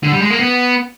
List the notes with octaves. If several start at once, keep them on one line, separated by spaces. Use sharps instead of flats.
D3
G3
G#3
A#3
B3